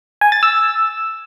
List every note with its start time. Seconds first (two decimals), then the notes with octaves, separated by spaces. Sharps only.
0.21 G#5
0.32 A6
0.43 E6